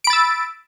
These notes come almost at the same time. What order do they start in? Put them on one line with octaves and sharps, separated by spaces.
D7 B5 A6 E6